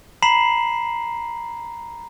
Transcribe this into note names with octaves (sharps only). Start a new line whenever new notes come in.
A#5 B5 B6 C7 E7 F#7